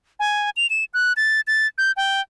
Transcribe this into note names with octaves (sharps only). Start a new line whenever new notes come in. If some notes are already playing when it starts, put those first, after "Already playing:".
G#5
F7
E7
F#6
A6
A6
G6
G5